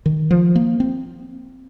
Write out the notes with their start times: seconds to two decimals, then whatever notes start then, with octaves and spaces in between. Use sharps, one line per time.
0.06 D#3
0.31 F3
0.55 A#3
0.80 C4